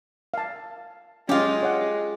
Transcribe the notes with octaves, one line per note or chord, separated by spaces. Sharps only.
F5 A5
G#3 C#4 F4 G4 F5
C#5 F#5